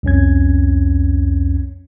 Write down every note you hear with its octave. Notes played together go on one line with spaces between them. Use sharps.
C2 F2 C#4 G#6